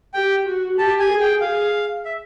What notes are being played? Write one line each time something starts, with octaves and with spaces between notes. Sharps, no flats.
G4 G5
F#4
G4 A5
G#5
G#4
G5
G#4 F5
E5